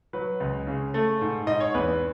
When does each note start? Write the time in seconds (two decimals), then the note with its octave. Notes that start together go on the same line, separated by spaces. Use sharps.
0.13 F#3 B4
0.40 C#2
0.67 C#3
0.94 A3
1.21 G#2
1.47 G#2 D#5
1.60 C#5
1.74 E2 B4